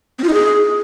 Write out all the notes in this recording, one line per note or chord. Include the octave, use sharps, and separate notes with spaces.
C4
F4
D#4
G#4